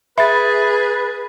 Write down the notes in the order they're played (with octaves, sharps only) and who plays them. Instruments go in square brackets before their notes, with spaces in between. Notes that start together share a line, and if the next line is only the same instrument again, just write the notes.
[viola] G#4 [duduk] B4 [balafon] E5 [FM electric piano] B5 A6